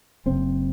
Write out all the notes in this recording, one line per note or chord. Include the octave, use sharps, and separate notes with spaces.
F#1 C4